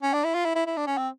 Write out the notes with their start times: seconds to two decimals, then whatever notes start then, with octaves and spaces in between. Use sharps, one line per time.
0.03 C#4
0.13 D4
0.24 E4
0.34 F4
0.45 E4
0.55 E4
0.67 E4
0.77 D4
0.87 C#4
0.97 C4